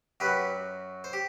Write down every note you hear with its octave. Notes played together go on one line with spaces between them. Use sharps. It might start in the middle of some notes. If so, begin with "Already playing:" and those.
F#2 F#3 G4 B4
C5
G4